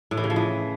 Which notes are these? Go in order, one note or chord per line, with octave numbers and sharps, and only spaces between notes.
A2
E3
C#3
F3
E3